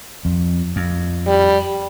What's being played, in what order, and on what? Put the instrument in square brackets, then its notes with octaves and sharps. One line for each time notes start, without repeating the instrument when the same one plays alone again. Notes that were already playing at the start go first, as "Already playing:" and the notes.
[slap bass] F2
F2
[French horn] G3